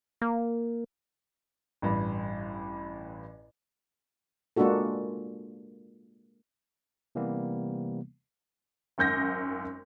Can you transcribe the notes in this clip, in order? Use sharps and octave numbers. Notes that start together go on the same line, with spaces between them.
A#3
A1 G2
G#3 A#3 D4 F4 F#4 A4
C3 E3 G3 A#3 B3
G#1 F#2 G6 A#6